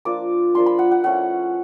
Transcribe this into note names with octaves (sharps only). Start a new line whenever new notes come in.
F3 A#3 D4 F4 D6
F3 A#3 D4 F4 C6
B5
F#5
F#5
F3 A3 C#4 E4 F#5